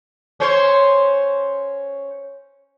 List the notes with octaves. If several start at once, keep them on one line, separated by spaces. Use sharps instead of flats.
C#4 C5 C#5